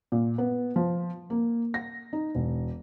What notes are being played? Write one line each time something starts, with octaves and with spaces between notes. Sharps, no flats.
A#2
B3
F3
A#3
A#6
D#4
E1